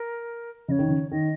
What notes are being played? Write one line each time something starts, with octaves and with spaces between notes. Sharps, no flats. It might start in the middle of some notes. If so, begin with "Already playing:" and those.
Already playing: A#4
C#3 C#5 D#5
D#3
C#3
D#3 D#5